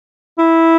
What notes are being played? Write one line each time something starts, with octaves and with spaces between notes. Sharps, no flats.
E4